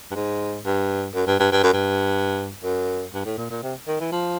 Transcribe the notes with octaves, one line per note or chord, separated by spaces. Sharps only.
G2
G#2
G2
F#2
G2
G2
G2
F#2
G2
F#2
G2
A2
A#2
A#2
C3
D#3
E3
F3